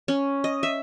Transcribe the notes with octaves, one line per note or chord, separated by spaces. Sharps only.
C#4
D#5
E5